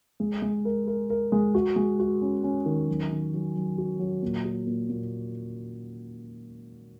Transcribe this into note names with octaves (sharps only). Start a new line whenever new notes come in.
G#3
G#3
A#4
A#4
A#4
G#3
F#4
G#3
F#4
C#4
C#4
D#3
F#3
D#3
F#3
F#3
F#4
F#3
A#2
F#4
A#2
A#2